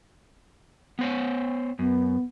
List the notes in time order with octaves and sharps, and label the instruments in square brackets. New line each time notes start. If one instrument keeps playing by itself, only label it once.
[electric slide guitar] B3 C5 C#5
[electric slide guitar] F#2 [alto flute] B3